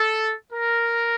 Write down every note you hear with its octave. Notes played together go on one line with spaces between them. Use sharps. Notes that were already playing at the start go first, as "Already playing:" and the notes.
Already playing: A4
A#4